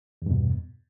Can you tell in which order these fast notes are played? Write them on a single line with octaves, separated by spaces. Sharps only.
E2 G2 B2